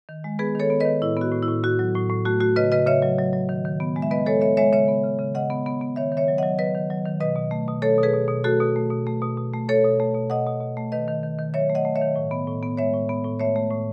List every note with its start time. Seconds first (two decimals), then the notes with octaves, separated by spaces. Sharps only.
0.09 D#3
0.24 G#3
0.39 B3 G#4 B4
0.55 D#3 A4 C#5
0.70 B3
0.80 D#3 B4 D#5
1.02 A2 E4
1.17 B3 F#4
1.32 A2
1.42 E4
1.48 A2
1.64 A2 F#4
1.79 F#3
1.95 A2
2.10 A2
2.26 A3 F#4
2.40 A3 F#4
2.56 C#3 B4 D#5
2.72 C#3 B4 D#5
2.87 C#3 C#5 E5
3.02 F#3
3.19 F#3
3.33 F#3
3.49 D#3
3.65 D#3
3.80 B3
3.96 G#3
4.02 E5
4.11 B3 B4 D#5
4.26 G#3 A4 C#5
4.41 B3 C#5 E5
4.57 G#3 C#5 E5
4.73 C#3 C#5 E5
4.88 B3
5.04 C#3
5.19 C#3
5.35 C#3 D#5 F#5
5.50 B3
5.66 B3
5.81 B3
5.96 D#3 C#5 E5
6.12 D#3
6.17 C#5 E5
6.28 F#3
6.38 F#3 D#5 F#5
6.59 F#3 B4 D#5
6.75 D#3
6.90 F#3
7.06 D#3
7.20 B2 B4 D#5
7.36 B2
7.51 A3
7.68 B2
7.82 A3 A4 C#5
7.98 B2
8.03 G#4 B4
8.14 B2
8.28 B2
8.44 A3 F#4 A4
8.61 B2
8.76 A3
8.91 B2
9.07 A3
9.22 B2
9.37 B2
9.53 A3
9.68 A3 A4 C#5
9.84 B2
10.00 A3
10.15 B2
10.30 B2 D#5 F#5
10.46 B2
10.61 B2
10.77 A3
10.92 D#3 B4 D#5
11.08 D#3
11.23 D#3
11.39 D#3
11.54 F#3 C#5 E5
11.69 A3
11.75 D#5 F#5
11.85 A3
11.96 C#5 E5
12.01 D#3
12.16 A2
12.31 B3
12.47 A2
12.63 B3
12.78 G#3 C#5 E5
12.94 A2
13.09 B3
13.25 A2
13.40 A3 C#5 E5
13.56 A3
13.71 A2